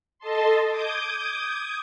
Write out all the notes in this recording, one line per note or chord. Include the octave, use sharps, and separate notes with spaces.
A4 D#5 A5 C6
D6 D#6 G6 G#6